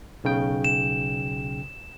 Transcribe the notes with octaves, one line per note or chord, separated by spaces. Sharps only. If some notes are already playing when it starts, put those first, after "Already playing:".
B1 C#3 G5
E7